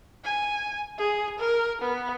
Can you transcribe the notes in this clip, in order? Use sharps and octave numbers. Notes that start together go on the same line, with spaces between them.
G#5
G#4
A#4
B3